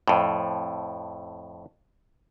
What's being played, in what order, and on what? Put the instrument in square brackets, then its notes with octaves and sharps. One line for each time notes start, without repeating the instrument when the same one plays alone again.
[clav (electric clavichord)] F2 A2